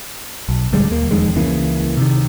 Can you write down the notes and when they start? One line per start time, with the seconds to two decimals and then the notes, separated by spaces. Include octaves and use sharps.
0.49 B1
0.72 D#1 D3 G3 G#3
0.90 D#2 A#3
1.11 E1 F2 D#3 G#3
1.35 C#2 C#3 E3 A#3
1.97 C3 D#3